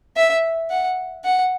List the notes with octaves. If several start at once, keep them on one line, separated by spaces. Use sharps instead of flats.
E5
F#5
F#5